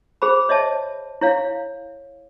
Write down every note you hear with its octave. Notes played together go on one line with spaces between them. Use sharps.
G#4 C5 B5
C#5 D#5 E5 A5
E4 C#5 F5